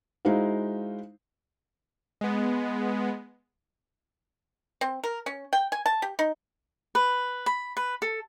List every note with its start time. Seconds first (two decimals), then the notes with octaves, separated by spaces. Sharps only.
0.25 G#3 D#4 E4 F#4 C5 F5
2.21 G#3 B3
4.81 C4
5.04 A#4
5.26 C#4
5.53 G5
5.72 G#5
5.86 A5
6.02 G4
6.19 D#4
6.95 B4
7.46 B5
7.77 B4
8.02 A4